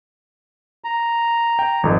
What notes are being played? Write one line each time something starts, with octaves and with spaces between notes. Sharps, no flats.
A#5
G5
G#1 F2